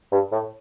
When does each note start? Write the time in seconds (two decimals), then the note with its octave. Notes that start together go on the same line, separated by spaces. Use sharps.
0.11 G2
0.32 A2